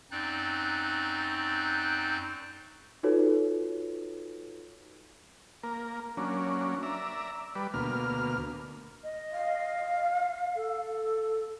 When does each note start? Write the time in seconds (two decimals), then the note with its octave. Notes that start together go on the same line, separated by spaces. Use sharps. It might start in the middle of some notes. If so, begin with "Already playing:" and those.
0.11 F#2 C4 D#4 D5 F#6 G6
3.03 D#4 F4 F#4 A4 B4 C#5
5.63 A#3 A#4
6.17 F#3 A#3 C#4 D4
6.83 D5 E5 A#5
7.55 G3 B4 D5
7.74 D2 B2 A#3 F6
9.04 D#5
9.32 F5
10.56 A4